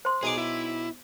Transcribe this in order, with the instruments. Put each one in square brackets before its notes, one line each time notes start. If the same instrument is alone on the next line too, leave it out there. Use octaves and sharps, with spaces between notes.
[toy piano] C5 C6
[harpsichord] B1 D#4 D6 [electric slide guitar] G#4
[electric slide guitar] E4